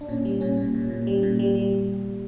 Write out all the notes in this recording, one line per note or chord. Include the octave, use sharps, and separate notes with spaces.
D4
A#2 C#4
G3
A#2 C#4
A#2
A#2
A#2
G3
A#2
G3
G3